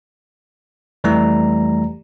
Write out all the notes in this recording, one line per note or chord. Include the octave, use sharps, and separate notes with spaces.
F2 E3 G3 A3 G4 A#5